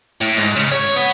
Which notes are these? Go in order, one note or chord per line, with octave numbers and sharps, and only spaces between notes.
A2
G#2
C#3
C#5
B3